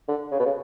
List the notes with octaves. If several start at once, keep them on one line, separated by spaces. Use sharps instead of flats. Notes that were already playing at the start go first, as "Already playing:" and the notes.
D3
C#3
B2
C#3